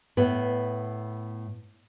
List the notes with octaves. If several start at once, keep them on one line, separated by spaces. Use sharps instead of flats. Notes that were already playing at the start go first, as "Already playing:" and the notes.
A2 B3